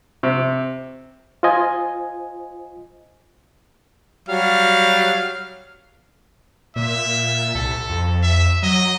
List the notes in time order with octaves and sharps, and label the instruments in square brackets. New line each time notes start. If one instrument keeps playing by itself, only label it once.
[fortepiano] C3
[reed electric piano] F4 C5 D#5 G#5
[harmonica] F#3 G3 F5
[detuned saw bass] A#2 [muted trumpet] E5
[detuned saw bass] C2 [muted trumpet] A4
[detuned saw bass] F2
[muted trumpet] E5
[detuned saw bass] F#3 [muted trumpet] D#5